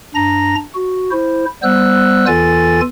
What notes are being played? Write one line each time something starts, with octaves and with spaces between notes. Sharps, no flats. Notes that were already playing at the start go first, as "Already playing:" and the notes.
G2 D4 A#5 A#6
F#4
E4 C5
G3 B3 C5 E6 F#6
E2 E3 F4 A4 G#5 A6